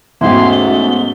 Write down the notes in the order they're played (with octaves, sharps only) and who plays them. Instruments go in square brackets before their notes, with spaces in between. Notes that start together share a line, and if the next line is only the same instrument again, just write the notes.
[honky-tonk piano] E2 G#2 [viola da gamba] B2 A3 C#4 [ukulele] E4 G4 [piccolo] C6
[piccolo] G7